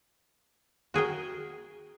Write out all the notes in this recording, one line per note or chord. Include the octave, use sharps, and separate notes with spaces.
F#4 G#4 A#4 G5